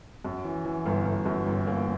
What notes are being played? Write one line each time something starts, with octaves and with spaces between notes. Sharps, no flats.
F#2
E3
E3
G1
G1
F#2
G1
A#3